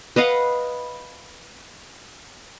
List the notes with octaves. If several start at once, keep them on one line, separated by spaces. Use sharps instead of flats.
B4 D#5 F5 F#5